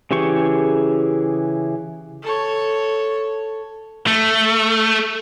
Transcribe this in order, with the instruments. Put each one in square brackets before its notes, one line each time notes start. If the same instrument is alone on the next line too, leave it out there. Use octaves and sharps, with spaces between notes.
[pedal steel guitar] C#3 E3 G4 G#4 C#6
[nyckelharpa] A4 C#5
[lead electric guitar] A3